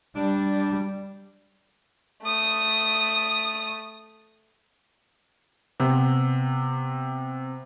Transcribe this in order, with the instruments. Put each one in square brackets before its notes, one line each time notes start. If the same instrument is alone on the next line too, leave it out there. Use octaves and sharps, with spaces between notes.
[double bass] G3 [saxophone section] D4
[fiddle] A3 D#6
[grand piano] C3 B3